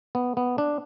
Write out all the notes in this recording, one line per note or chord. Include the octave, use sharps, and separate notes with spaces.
B3
B3
D4